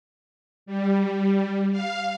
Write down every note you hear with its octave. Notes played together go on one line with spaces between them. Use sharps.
G3
F5